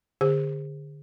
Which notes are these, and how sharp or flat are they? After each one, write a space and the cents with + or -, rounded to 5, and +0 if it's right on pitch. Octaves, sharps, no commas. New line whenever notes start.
D3 +0 G#4 -40 C5 +0